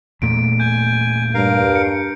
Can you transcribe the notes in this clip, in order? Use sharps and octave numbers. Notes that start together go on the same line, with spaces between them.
E2 A#2 A3 D7
G#5 G6
G2 A#4 F5
C#7